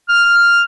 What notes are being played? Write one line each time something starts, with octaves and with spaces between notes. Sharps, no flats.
F6